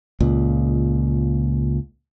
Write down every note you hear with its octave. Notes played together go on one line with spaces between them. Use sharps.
C#2 A#2